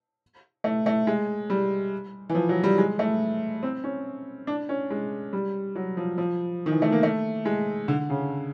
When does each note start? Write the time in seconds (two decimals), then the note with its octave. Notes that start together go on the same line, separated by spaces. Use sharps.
0.64 A3
0.86 A3
1.07 G#3
1.50 G3
2.29 E3
2.35 F3
2.49 F#3
2.63 G3
2.78 G#3
2.99 A3
3.63 C4
3.84 C#4
4.47 D4
4.69 C#4
4.90 G#3
5.33 G3
5.75 F#3
5.97 F3
6.18 F3
6.66 D#3
6.71 E3
6.82 A3
6.92 A#3
7.03 A3
7.45 G#3
7.88 D3
8.10 C#3